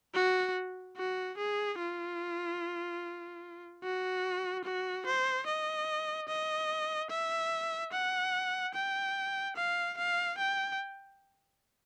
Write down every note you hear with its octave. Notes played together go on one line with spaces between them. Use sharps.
F#4
F#4
G#4
F4
F#4
F#4
C5
D#5
D#5
E5
F#5
G5
F5
F5
G5